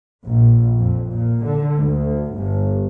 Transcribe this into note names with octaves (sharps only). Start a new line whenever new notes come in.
A#1
F2
A#2
D3
D2
G1